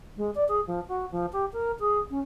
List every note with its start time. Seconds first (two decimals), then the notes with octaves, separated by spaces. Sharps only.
0.17 G#3
0.35 D5
0.48 G#4
0.67 F3
0.88 F#4
1.12 F3
1.33 G4
1.53 A#4
1.80 G#4
2.10 C#4